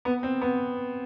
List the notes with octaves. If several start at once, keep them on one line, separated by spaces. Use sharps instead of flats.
B3
C4
B3